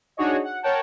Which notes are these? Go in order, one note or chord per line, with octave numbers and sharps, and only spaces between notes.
D4 D#4 F#4 G#4 C#5 D#5
F#5
A#4 C#5 F#5 G5 A5